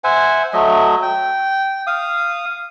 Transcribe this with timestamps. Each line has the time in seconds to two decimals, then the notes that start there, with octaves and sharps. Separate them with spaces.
0.04 C5 E5 F#5 G#5
0.53 F#3 A3 D#5 E5
1.03 G5
1.87 F5 D#6